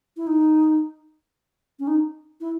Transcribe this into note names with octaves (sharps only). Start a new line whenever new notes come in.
E4
D#4
C#4
D#4
E4